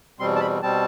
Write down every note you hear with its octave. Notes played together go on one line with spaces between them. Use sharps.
E2 B2 G3 C4 C6
A5
B5
B2 G3 C4 A5